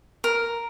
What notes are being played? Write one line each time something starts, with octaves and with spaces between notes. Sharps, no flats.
A#4